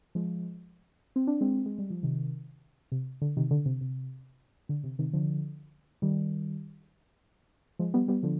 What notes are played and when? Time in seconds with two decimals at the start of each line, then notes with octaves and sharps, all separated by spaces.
0.15 F3 G#3
1.16 C4
1.27 D4
1.41 G#3 C4
1.66 G#3
1.78 G3
1.90 F3
2.03 C3 D#3
2.92 C3
3.22 D3
3.37 C3 D#3
3.51 D3
3.66 C3
3.81 C3
4.69 D3
4.84 C3
4.99 C3 D#3
5.13 D3 F3
6.02 D#3 G3
7.79 F3 G#3
7.94 G3 B3
8.08 G3 B3
8.23 D3 F3